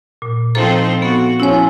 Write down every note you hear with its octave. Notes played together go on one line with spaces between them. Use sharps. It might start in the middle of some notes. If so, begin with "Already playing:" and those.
A#2
F3 C4 D#4 A4 C5 A#5
B3 F#4 A4
F3 C#4 E4 C#5